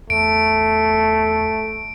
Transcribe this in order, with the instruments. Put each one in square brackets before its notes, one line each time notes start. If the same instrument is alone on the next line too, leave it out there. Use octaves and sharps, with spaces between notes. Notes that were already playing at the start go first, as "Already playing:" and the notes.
[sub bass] E2 [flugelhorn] A3 [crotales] D7